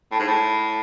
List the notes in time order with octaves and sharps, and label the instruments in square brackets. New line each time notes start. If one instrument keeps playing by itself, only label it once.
[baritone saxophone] A2
G#2
A2